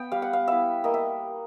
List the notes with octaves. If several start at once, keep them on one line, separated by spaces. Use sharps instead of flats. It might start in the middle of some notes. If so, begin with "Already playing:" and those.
Already playing: B3 G5
G3 F5
F#5
F5
B3 E4 E5
A#3 D#5
E5